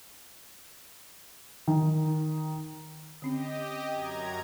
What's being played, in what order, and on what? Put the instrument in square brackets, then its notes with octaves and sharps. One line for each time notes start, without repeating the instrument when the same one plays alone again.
[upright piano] D#3
[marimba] D3 C4 C#4 [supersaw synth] G4 D#5
[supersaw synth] F#2 A#5 G#6